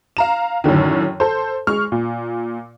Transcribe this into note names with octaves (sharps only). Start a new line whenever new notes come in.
F5 A#5 E7
F#2 A2 D3 D#3
A4 C5
G#3 C#6 F6
A#2